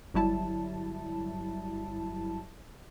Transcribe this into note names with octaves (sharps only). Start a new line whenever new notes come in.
G1 F#3 G3 E4 A5